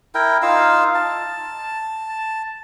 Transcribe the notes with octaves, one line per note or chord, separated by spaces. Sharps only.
E4 A#4 G5
D#4 F4 F5 E6
A5